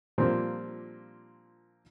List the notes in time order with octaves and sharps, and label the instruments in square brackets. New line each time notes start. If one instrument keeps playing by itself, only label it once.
[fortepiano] A#2 F3 G3 A#3 C4 D4